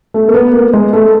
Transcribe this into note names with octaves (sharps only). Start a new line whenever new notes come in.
A3
A#3
B3
A#3
G#3
A3